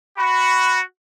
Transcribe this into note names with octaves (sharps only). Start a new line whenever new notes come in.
F#4 B5